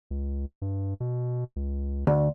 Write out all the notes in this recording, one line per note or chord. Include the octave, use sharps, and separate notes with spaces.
C#2
G2
B2
C#2
D2